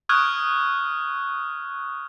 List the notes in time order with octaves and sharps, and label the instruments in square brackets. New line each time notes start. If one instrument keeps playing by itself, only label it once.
[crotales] C#6 D#6 F6 F#6 G#6